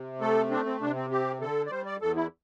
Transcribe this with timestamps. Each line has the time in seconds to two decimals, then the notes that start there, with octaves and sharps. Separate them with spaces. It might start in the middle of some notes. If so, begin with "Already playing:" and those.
Already playing: C3
0.21 A3 A4
0.51 C4 D4
0.66 C4
0.81 C3 D4
0.96 C4
1.11 C4 G4
1.41 D3 A4
1.66 D5
1.71 G3 C5
1.86 D5
2.01 E2 A4
2.16 E4